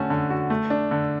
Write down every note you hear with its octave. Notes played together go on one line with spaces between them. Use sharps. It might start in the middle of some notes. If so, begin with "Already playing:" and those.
Already playing: D3 A3 C#4 F#4
D3
F#4
A3
D4
D3